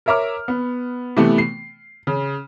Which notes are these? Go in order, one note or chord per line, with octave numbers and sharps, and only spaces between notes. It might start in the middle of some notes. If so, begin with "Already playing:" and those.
A#4 C#5 E5 A#5 D6 F6
B3
C3 E3 A3 B3
C7
C#3